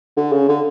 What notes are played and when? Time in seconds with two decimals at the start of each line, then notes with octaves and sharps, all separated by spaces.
0.17 D3
0.32 C#3
0.48 D3